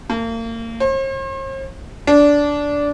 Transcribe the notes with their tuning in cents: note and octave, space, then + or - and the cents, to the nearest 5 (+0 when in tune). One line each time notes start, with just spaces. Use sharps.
A#3 -35
C5 +45
D4 -15